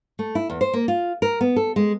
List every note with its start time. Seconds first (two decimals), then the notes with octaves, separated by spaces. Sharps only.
0.19 A3
0.35 E4
0.50 E2
0.61 C5
0.74 A#3
0.88 F4
1.22 A#4
1.41 B3
1.56 A4
1.76 G#3